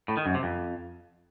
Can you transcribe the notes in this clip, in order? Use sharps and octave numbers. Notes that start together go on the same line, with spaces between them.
A2
D#3
F#2
C3
F2